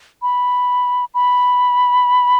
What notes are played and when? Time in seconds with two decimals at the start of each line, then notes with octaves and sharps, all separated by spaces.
0.22 B5
1.14 B5